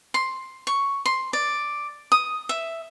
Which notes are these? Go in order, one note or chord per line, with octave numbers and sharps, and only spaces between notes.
C6
C#6
C6
D5
D#6
E5